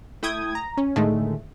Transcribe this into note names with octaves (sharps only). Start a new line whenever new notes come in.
A3 E4 G5 D#6 G#6
A#5
C#4
A2 D3 D#3 G#3 A3